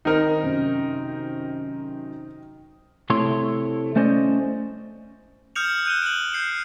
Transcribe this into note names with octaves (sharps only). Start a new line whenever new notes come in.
D#3 C4 D#4 A#4
F#2 C3
C3 A3 E4 C#5 C6
A3 C#4 C5 D5 D#5
D#6 F6 G6 C#7 E7 F7
F#6 G6 D#7 E7 G7
D7 F#7
G6 C7 C#7 E7